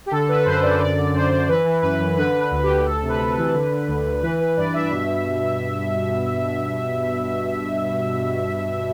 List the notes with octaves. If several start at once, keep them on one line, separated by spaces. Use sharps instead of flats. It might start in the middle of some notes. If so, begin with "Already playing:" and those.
G4
D3 A4
D3 B4
F#2 C5
F#2 D5
D3 D5
D3
F#2 C5
F#2
E3 B4
E3
F#2 B4
F#2
D3 B4
D3
B4
D2
D2 G4
D2 A4
C3
B4
D2
B4
E3
D3
D3
D2
D2
E3 B4
E3 B4
G2 D5
G2 E5
B2